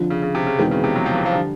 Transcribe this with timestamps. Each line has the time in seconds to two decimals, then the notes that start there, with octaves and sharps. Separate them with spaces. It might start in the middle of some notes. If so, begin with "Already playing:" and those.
Already playing: F2 D3 F3
0.10 C#3
0.22 C#3
0.35 C3
0.47 C#3
0.59 E2 B2 D#3 G#3 C4 D#4
0.71 C#3
0.84 C3
0.96 F#3
1.06 F3
1.16 E3
1.26 F3
1.32 D3 G3